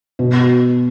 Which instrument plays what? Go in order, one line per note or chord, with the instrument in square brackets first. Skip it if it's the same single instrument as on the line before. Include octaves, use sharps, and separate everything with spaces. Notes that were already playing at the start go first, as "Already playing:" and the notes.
[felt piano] B2